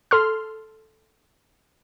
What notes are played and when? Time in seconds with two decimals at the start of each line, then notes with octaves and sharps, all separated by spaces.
0.11 A4 C6 F6